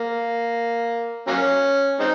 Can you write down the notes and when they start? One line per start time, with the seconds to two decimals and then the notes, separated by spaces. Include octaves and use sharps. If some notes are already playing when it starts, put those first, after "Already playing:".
Already playing: A#3
1.28 F#3 A#3 C#4
2.00 G#3 C4 D#4